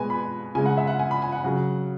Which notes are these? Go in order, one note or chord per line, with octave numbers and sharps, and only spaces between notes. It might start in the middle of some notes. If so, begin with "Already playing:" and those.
Already playing: B2 G#3 B4 G#5
B5
C#3 G#3 G#5
F#5
E5
F#5
G#5
B5
G#5
F#5
C#3 F#3